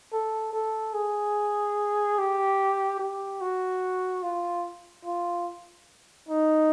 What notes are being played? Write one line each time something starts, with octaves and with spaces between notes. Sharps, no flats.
A4
A4
G#4
G4
G4
F#4
F4
F4
D#4